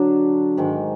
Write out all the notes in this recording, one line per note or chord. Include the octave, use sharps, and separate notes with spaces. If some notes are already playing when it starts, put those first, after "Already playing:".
Already playing: D3 F#3 D4
G#2 D#3 G#3